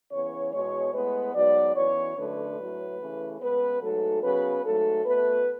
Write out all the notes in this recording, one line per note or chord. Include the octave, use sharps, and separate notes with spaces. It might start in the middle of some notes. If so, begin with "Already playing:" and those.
C#3 E3 B3 C#5
E2 B2 G#3 C#5
A2 G#3 B3 B4
G#2 F#3 B3 D5
F#2 E3 B3 C#5
F#2 D3 F#3 A3 B4
A2 F#3 A3
C#3 E3 A3
C#3 G#3 B3 B4
G#2 F#3 A3 A4
C#3 F#3 B3 B4
G#2 F#3 A3 A4
B2 A3 B4